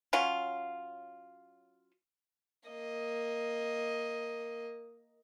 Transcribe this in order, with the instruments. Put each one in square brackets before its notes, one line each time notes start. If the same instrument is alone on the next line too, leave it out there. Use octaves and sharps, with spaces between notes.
[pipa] F#3 C#4 F4
[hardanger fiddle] A#3 D#5